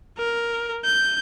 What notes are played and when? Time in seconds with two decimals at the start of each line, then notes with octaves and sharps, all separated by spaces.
0.18 A#4
0.85 G6